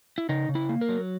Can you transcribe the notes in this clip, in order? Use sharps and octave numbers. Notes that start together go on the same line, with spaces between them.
E4
C#3 D#4
C#3
E4
A#3
A#4
F#3